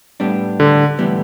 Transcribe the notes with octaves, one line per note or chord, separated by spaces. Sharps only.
A2 G3 B3 D4
D3
A2 E3 G3 B3